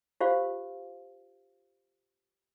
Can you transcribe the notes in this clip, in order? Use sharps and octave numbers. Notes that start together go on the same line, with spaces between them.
F4 G4 C5 F5